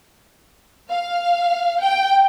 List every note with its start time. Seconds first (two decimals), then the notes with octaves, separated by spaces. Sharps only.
0.90 F5
1.81 G5